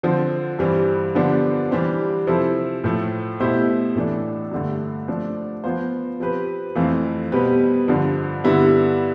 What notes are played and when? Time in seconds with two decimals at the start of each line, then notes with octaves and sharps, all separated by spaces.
0.03 D3 F3 C4
0.59 G2 E3 G3 C4
1.15 D3 F3 B3 D4 G4
1.71 E3 G3 D4 G4 C5
2.27 C3 F3 C4 E4 A4
2.84 A2 F3 A3
3.40 B2 A3 E4 G4 C5
3.95 A2 E3 A3 D4 A4
4.51 G2 D3 A3
5.08 F3 A3 D4
5.64 F3 B3 F4 C5
6.20 F3 C4 G4 B4
6.75 F2 E3 A3 C4 F4
7.32 B2 G3 C4 G4 B4
7.88 G2 D3 F3
8.44 G2 D3 G3 B3 E4